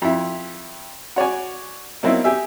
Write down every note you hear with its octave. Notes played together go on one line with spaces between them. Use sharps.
F2 E4
F#4 C#5 D5 G#5
B2 F#3 A#3 C4 D#4 E4
G4 G#4 E5